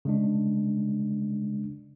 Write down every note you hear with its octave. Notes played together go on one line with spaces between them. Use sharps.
C#3 G#3 D4